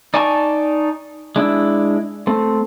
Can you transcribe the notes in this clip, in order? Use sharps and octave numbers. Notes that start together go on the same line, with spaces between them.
D#4 D5 G#5 A5 C#6
G#3 D4 E4
A3 C4